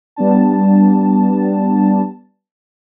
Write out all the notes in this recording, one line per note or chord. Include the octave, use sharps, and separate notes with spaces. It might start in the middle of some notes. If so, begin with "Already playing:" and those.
G3 B3 D4 A5